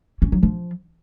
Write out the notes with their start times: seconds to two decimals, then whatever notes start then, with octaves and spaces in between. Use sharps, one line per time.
0.22 C#4
0.32 F#3
0.43 F3